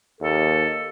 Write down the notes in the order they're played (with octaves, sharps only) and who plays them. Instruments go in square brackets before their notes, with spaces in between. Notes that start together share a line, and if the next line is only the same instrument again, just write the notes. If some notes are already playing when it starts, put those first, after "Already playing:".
[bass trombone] D#2 [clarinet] A4